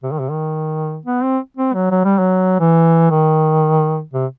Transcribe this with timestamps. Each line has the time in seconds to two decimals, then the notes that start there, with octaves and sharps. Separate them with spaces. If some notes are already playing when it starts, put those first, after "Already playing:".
0.03 C3
0.11 D#3
0.20 C3
0.29 D#3
1.05 B3
1.23 C4
1.57 C4
1.74 F#3
1.91 F#3
2.04 G3
2.19 F#3
2.60 E3
3.10 D#3
4.13 C3